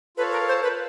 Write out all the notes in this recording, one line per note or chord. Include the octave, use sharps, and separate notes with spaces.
F4 A4 B4 C#5 F5 A5
A#4
C5
B4